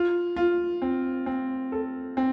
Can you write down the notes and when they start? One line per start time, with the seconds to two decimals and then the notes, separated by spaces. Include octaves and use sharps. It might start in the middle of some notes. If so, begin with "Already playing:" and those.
Already playing: F4
0.36 F4
0.82 C4
1.26 C4
1.72 A4
2.17 C4